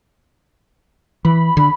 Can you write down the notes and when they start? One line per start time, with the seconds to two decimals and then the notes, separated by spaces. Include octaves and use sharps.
1.25 E3 B5
1.57 D3